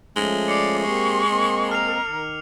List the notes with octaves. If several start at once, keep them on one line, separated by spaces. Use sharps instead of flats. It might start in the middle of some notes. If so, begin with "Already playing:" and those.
F3 G#3 A3 C#4 G7
D5 D6 C7 C#7
A#3 C4 G4 C#6 C7
A#3 C4 D#5
A#4 F6 C7 F7
D#3